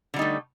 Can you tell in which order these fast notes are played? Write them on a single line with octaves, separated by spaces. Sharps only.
D3 G3 D#4 A3